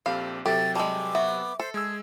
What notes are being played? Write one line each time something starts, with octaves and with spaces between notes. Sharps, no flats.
A#1 C4 G4 A4 F5 B5
C3 F#3 G4 A4 E5 A6
G3 G#3 A5 D6
B3 E5 C#6
A4 C5
G#3 G#4 E6